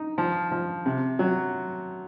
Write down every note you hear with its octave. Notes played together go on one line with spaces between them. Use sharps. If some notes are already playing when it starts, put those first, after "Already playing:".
Already playing: D#4
F3
F3
C3
F#3